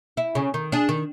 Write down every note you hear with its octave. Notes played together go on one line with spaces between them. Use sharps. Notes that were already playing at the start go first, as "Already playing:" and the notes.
E4
C#3
D#3
D4 G#4
D#3